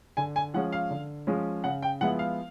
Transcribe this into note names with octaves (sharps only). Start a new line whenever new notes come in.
D3 G#5
G#5
F3 G#3 C#4 F#5
F5
D3
F3 G#3 C#4
C#3 F#5
G5
F3 G#3 B3 E4 F#5
F5